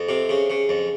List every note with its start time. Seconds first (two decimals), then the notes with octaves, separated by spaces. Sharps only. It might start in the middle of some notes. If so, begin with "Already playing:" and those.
Already playing: F2
0.09 C3
0.29 C#3
0.50 C#3
0.69 F2